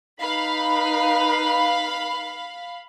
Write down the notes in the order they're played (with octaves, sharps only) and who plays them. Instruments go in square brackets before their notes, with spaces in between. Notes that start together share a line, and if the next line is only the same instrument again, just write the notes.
[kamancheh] D#4 B4 [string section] F5 B5